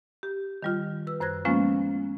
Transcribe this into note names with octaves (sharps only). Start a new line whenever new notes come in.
G4
D#3 G3 F4
B4 E6
F#2 C5 F#6 G#6 A#6
F3 G#3 A#3 B3 C#4 F4